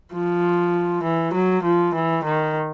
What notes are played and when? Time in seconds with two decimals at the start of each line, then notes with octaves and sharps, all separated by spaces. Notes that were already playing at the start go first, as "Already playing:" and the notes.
0.13 F3
1.04 E3
1.34 F#3
1.63 F3
1.94 E3
2.24 D#3